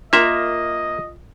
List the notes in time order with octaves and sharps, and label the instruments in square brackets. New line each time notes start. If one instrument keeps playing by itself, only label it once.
[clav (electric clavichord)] A#3 E5 [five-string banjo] F4 A#4 A#5 [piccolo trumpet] D#5